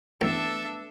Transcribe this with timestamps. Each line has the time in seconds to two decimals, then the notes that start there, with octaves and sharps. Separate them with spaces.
0.21 A1 A3 B3 D4 A4 E5